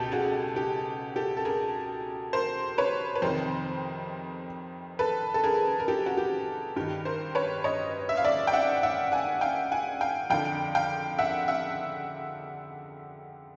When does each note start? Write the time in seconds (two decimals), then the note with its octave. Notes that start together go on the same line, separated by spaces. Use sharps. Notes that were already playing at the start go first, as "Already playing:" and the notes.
Already playing: C#2 B2 G4 A4
0.12 F#4 G#4
0.56 G4
1.16 G4 A4
1.37 A4
1.45 G#4 A#4
2.33 A#4 C5
2.78 B4 C#5
3.15 B4
3.22 F2 C3 D#3 A#4 C5
4.99 A4 B4
5.34 A4
5.44 G#4 A#4
5.80 A#4
5.88 G4 A4
6.06 F#4
6.17 G4
6.76 G2 D#3 G4
7.05 A#4 C5
7.35 B4 C#5
7.64 C#5 D#5
8.09 E5
8.17 F5
8.24 D5 E5
8.47 G5
8.53 E5 F#5
8.83 E5 F#5
9.12 F#5 G#5
9.41 F5 G5
9.72 F#5 G#5
10.01 F5 G5
10.30 F2 D3 F5 G5
10.75 F5 G5
11.19 E5 F#5
11.48 E5 F#5